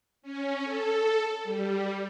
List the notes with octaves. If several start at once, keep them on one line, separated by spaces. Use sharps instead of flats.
C#4
A4
G3